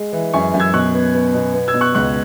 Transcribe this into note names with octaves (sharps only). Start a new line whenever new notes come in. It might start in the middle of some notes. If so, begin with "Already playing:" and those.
Already playing: G#3
E3
F#2 G#5 C#6
F#2
E6 G#6
B2 C#6 F#6
B3
B3
B2
B3
E6 G#6
B2
C#6 F#6
C#2 C#6 F#6